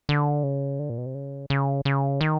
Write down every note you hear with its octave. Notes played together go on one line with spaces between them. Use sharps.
D3
C#3
D3
A#2
B2
C3
C#3
C#3
C#3
D#3